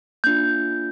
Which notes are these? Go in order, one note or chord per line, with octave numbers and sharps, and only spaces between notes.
A#3 D4 F4 G6